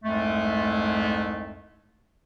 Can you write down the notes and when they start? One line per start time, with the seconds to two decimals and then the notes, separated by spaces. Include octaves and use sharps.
0.04 C2 F2 G#2 G#3 A3